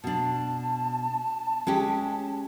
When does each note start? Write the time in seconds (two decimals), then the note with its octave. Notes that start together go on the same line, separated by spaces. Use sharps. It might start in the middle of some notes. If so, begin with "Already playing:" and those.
0.04 B2 D4 A5
1.67 G#3 C#4 G4